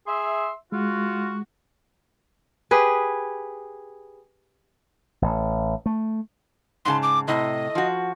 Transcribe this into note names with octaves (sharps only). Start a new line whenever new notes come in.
G#4 E5 C6
G#3 F4 F#4
G4 G#4 B4
A1
A3
G#2 C#3 A5 C6
D6
A2 C3 D#5
F3 F#4